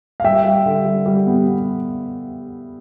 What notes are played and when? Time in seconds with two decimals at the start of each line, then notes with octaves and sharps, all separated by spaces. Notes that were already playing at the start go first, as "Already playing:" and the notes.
0.20 F5
0.24 G3 E5 G5
0.44 G3
0.66 D3
0.85 G3
1.06 G3
1.27 B3